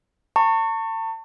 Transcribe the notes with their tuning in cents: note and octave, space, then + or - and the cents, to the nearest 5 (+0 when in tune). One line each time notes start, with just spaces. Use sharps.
A5 +40 C#6 -10